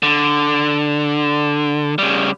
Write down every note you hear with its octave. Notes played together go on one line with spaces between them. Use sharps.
D3
C#3 G3